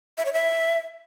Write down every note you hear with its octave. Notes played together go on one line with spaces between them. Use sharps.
E5
C#5
E5